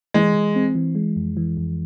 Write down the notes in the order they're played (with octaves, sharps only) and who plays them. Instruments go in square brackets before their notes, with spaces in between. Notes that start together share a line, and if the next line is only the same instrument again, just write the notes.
[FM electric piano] E3 [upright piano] G#3
[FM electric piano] E3
C4
E3
G#3
F2
E3
F2